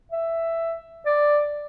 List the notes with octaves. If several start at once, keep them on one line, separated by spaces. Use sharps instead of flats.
E5
D5